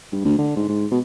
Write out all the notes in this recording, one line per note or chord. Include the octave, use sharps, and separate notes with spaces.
G2
D2
D3
G#2
G#2
B2